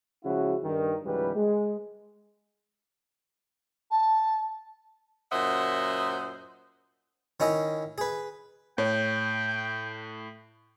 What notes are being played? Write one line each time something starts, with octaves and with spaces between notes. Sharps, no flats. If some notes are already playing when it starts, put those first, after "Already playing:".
C#3 F3 G#3 E4 F#4
G2 D#3
C#2 G#2 E3 F#3 G3 B4
G#3
A5
F#2 A#2 C5 D#5 E5 F#5
D#3 C#4 E4 D#5
G#4 B4
A2 C#5 G5